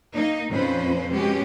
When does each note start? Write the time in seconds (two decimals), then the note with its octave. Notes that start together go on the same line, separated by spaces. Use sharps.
0.12 A#3 D#4
0.49 F2 A#2 F3 C#4 B4 C5
1.09 B2 G#3 C#4 G4